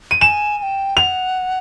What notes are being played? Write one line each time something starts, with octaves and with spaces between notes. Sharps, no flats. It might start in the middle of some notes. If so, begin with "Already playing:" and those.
D#7
G#5 E7
G#5
G5
F#5 G5 F7